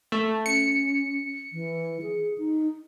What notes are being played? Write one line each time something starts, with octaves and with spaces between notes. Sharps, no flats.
A3
C#4 C#7
E3
G#4
D#4